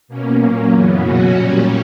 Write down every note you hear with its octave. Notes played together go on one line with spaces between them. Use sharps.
B2 A#3 C#4
A#2 F#3 A#3 C#4
F#2 C#3 E3 B3
B2 F#3 C#4 F#4
A#2 G3 C#4